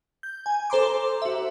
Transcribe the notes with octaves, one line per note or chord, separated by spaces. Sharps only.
G6
G#5
A4 C5 A#5 C6 D6
F#4 E5